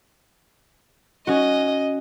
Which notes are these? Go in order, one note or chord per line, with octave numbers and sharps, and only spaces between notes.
C#4 F#4 D#5